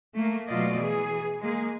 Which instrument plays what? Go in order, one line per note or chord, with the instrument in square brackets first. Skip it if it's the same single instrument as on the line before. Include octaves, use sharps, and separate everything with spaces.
[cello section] A3 A#3
B2 F#3 A3 F4 D5 D#5
E3 G#4
G#3 A#3 G#4